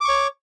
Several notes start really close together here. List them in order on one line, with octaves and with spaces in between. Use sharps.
D6 C#6 C#5